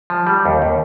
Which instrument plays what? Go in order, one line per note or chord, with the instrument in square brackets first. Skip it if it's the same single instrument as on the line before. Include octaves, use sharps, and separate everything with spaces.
[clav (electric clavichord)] F3
G3
D#2
D#2